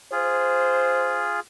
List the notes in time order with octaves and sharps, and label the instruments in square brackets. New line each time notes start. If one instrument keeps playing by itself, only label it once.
[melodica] F4 G#4 [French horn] C5